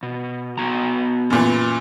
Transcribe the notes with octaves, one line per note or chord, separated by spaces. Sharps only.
B2
B3 F#4 A#5
F#2 A#2 E3